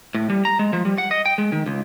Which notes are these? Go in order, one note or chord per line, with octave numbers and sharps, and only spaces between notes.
A2
G3
A#5
G#3
F3
G3
F#5
D#5
G5
G#3
D#3
C#2